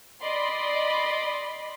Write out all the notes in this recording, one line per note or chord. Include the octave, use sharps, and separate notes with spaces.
D5 D#5 B5 C6